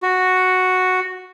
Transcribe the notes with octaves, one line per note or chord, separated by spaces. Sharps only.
F#4